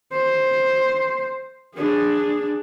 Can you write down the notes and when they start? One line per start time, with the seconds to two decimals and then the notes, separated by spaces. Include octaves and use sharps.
0.13 C5
1.76 D4 G#4